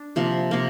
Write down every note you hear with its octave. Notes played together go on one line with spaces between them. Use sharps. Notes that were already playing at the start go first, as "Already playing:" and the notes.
Already playing: D4
C3 F3 A#3
C3 F3 A#3